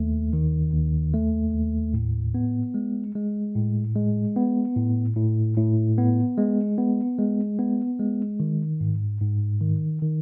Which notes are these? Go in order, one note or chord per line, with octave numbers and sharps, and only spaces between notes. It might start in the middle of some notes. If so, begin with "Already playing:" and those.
Already playing: D#2 A3
D#3
D#2
A3
D#2
A2
B3
G#3
G#3
A2
G#3
B3
A2
A2
A2
B3
G#3
B3
G#3
B3
G#3
D#3
G#2
G#2
D#3
D#3